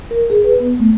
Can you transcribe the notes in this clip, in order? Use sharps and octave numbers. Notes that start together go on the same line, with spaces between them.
A#4
G#4
B4
B3
A3